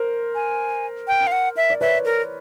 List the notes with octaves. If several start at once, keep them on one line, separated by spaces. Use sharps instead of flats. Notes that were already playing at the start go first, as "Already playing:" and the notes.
Already playing: A#4 C5
G#5
G5
F5
F#5
E5
D5
B4 C#5 E5
A#4